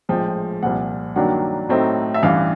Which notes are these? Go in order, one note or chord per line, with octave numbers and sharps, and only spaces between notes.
A#1 A2 F3 G#3 G5
C2 A#2 F3 F#5
G2 D#3 F#3 A#3 D4 F#5
A2 F#3 A3 C4 D#4
E5
A1 G2 E3 F5